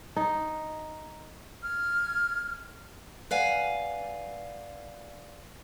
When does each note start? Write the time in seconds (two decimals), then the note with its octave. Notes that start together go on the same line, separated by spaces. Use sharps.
0.16 D#4
1.63 F6 G#6
3.31 B4 D5 F5 F#5 G#5